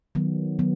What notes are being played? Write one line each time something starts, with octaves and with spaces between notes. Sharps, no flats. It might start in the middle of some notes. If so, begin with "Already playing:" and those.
D#3 F#3 B3
D#3 F#3 B3